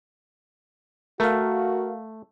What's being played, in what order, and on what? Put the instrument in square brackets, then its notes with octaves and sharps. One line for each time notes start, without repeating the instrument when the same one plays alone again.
[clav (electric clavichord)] A3 [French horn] F#4 [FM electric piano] A#4 F5